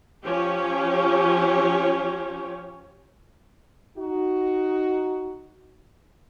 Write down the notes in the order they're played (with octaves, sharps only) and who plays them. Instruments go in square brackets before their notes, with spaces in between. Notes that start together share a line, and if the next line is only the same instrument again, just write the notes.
[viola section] F3 C#4 G4 C#5
[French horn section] D#4 F#4